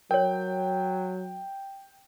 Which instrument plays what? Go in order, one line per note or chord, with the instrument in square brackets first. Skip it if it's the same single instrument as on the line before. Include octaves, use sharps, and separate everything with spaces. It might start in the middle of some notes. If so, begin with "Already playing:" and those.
[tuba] F#3 [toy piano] A#4 C#5 [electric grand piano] G5